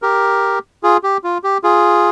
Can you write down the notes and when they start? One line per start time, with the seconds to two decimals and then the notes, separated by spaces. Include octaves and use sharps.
0.02 G4 A#4
0.83 F4 G#4
1.03 G4
1.24 F4
1.44 G4
1.64 F4 G#4